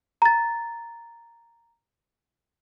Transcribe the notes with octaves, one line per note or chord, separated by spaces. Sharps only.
A#5 A6